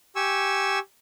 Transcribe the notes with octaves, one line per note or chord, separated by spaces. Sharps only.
G4 G#5 C#6 E6